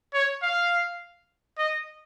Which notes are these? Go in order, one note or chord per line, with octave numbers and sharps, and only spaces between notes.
C#5
F5
D#5